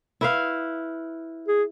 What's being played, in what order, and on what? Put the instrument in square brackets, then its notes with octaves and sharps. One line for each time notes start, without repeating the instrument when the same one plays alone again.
[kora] E4 B4 F5
[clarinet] G#4